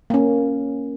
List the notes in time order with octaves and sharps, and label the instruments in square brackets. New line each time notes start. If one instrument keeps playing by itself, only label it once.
[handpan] A#3 C#4